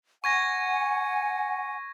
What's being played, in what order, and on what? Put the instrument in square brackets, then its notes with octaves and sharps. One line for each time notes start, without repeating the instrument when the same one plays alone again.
[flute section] F#5 G#5 [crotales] C#6 G#6 A#6